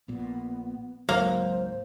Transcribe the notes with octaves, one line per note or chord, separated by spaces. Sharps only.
A#1 A#2 B3
G#1 C#2 G#2 F#3 A#3 C5